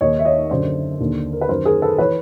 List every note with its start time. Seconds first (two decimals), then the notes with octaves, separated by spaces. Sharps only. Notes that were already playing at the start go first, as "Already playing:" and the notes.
0.01 D#2 D#3 C#5 D#5
0.19 E5
0.25 C#5 D#5
0.50 F#2 D3 C5 D5
1.00 D#2 D3
1.33 A#4
1.41 B4
1.49 F#2 D#3 A#4 C5
1.65 G#4 A#4
1.82 A4 B4
1.98 E3 B4 C#5